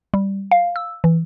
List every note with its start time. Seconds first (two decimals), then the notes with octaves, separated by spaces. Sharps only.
0.14 G3
0.51 F5
0.76 E6
1.04 E3